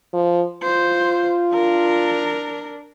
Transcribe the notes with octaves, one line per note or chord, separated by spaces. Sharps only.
F3
F4 C5
D4 A#4